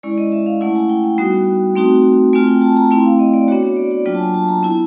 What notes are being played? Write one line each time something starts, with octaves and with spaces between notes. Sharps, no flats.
G#3 C#4 E4 D5
D#5
E5
F5
A3 C#4 E4 F#5
G#5
G5
G5
G3 B3 D#4 F#4
A3 C4 D#4 F#4
A3 C4 F4 G#5
G5
A5
A#5
A3 C4 E4 G5
F5
D#5
D5
B3 D4 F#4 C#5
C#5
D5
D5
F#3 A#3 D4 F4 G5
A5
G#5
A5
A#5
B3 E4